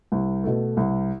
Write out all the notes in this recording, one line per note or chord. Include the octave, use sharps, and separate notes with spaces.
C2
B2 A3
C2